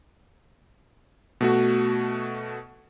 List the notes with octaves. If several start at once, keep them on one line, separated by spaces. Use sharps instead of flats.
B2 A3 F#4